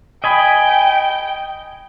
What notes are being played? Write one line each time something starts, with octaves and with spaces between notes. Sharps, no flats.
D#5 G5 G#5 B5